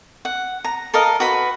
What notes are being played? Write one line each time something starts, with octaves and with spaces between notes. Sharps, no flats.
F#5
A#5
A4 A#4 D#5 F5
F#4 B4